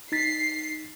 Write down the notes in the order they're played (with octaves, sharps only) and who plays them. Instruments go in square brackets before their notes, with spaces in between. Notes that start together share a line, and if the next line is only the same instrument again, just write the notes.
[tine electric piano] D#4 A6 B6 [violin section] C7